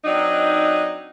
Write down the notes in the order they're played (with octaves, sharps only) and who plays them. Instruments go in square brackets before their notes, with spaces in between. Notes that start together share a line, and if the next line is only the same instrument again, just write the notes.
[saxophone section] F#3 C4 D4 D#4